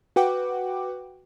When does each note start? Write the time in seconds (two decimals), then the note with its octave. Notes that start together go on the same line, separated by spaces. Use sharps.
0.16 F#4 B4 F#5 G5 D6